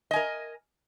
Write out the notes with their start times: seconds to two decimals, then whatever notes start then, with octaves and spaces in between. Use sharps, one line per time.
0.11 D#5
0.13 G#5
0.16 A#4